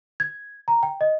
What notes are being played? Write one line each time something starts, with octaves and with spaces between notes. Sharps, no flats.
G#6
A#5
G5
D#5